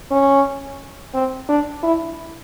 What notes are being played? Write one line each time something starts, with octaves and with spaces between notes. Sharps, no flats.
C#4
C4
D4
E4